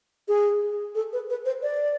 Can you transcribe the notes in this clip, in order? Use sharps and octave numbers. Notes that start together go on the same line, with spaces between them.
G#4
A4
B4
B4
C5
D5